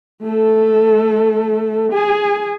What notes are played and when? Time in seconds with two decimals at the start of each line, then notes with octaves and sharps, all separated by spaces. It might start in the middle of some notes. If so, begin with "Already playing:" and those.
0.22 A3 A4
1.92 G#4 G#5